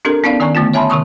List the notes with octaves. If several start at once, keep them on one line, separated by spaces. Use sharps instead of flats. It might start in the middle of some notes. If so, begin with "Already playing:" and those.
C4 D4 G4 A4 A#4
B3 C#4 D#4 D5 F5
D#3 D5 G#5 A#5 C#6
D3 A3 B3 F4
C#5 E5 G#5 A5 B5 C6
C3 D#3 C#6 D#6